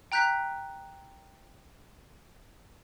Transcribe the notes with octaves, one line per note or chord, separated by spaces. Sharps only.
G5 A#5 F#6 G6 B6